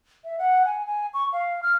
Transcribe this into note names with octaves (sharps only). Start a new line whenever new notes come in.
E5
F#5
G#5
G#5
C#6
F5
F6